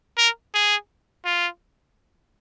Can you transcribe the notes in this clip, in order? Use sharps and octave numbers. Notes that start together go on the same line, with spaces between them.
A#4
G#4
F4